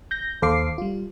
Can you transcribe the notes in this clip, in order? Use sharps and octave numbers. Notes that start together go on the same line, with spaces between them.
G6 A#6
D#2 A4 C5 F5 D6 C7
G3 F4